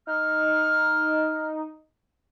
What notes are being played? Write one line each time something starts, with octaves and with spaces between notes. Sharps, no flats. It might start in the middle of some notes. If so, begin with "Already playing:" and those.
D#4 F6